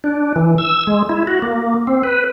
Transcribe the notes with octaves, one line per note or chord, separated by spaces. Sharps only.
D4
E3
E6
G#3
E4
F#4
A#3
C4
B4